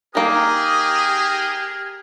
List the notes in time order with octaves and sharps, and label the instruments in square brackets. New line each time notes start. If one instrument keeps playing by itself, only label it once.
[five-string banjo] D#3 A#3 [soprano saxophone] G4 [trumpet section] G#4 A#4 [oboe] D#6